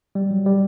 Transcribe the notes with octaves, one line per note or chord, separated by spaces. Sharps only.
G3
F#3
G3